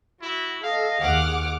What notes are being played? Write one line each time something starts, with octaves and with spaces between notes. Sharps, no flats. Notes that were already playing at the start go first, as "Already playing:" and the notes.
E4 F#4
A4 D#5 F5
D#2 G#4 F#5 D6 F6